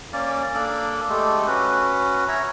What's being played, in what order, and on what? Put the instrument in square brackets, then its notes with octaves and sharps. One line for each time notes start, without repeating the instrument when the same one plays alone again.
[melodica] A#3 C#4 D5
A#3 D4 A4
G#3 A3 G4 A4
C#4 F#4 B4
C#5 E5 A#5